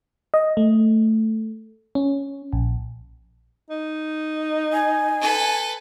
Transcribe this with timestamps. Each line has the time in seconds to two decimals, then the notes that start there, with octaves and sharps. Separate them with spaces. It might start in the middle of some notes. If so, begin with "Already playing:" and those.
0.34 D#5
0.57 A3
1.95 C#4
2.53 A#1
3.70 D#4
4.73 G#5
5.20 A4 B4